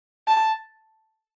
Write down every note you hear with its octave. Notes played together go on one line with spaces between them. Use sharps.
A5